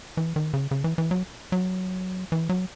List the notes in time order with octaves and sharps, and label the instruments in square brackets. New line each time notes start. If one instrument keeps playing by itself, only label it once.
[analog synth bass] E3
D#3
C#3
C#3
E3
E3
F#3
F#3
E3
F#3